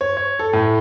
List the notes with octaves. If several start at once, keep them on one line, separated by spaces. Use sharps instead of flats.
C#5
C#5
A4
A2